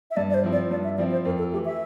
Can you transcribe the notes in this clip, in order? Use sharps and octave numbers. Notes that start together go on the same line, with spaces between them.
E5
G2 D5
D5
C5
F3 C4 E4
D5
G2 D5
E5
F3 C4 E4 D5
C5
F2 A#4
A4
E3 A3 G4
E5